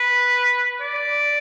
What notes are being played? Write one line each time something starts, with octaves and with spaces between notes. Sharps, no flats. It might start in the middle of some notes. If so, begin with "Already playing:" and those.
Already playing: B4
D5